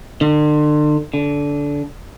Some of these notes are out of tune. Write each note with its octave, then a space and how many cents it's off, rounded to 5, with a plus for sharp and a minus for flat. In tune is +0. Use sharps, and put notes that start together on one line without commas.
D3 +40
D3 -20